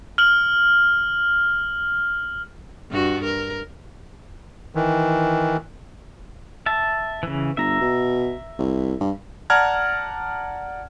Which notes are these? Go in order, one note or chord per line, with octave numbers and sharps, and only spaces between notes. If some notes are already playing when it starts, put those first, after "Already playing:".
F6 F#7
G2 F#4
A#4
D#3 E3
E5 A5
C#3 E3
G1 E5 A#5
B2
C2
G2
D5 F#5 A5 A#5 F6 G#6